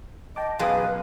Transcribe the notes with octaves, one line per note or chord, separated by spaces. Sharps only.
D#5 G5 A5 D6
F#2 B2 G#4 B4 F5 C6 D#6